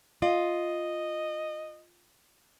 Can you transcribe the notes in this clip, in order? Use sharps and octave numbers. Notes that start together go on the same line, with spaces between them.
F4 D#5